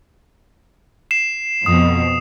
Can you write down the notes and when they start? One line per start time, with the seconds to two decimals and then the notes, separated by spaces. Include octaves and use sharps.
1.11 C7 E7
1.66 F2 B2 D#6